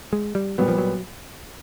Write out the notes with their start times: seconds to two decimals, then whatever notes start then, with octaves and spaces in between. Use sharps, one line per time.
0.13 G#3
0.35 G3
0.58 A#2 F#3 G3 B3
0.68 F3
0.78 F#3